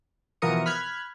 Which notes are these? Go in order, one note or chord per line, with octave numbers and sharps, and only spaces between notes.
B2 E3 F3 A#4 D#6 C#7
B5 F6 F#6 G#6